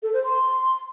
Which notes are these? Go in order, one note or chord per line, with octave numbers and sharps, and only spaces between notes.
A4
C5
C6